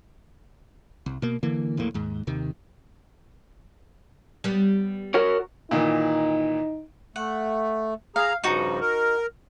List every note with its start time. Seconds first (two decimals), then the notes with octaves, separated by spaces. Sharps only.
1.06 C2
1.22 B2 A#3
1.43 D3 E3 A#3
1.77 E1 A#1 A2 A#3
1.94 D#2 G#2
2.27 D#2 C3 D#3
4.44 G3 B3
5.14 F#4 A#4 C#5
5.71 A#2 D#3 E3 D#4
7.16 A3 F#5
8.16 G#4 F5 A#5
8.44 G2 C#3 F3 D#4 F#4 A#5
8.81 A#4